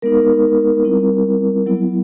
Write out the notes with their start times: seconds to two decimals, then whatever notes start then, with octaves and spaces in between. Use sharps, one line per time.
0.02 G#3 B3 D#4 A#4
0.84 G3 C4 E4
1.66 F#3 B3 E4